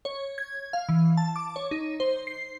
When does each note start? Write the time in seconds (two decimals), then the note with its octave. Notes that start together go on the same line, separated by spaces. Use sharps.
0.05 C#5
0.38 G#6
0.73 F5
0.89 E3
1.17 A5
1.36 D6
1.56 C#5
1.71 D#4
2.00 C5
2.27 C7